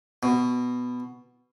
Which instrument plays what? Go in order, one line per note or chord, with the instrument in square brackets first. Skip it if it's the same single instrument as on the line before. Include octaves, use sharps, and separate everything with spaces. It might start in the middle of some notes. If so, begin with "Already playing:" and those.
[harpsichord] B2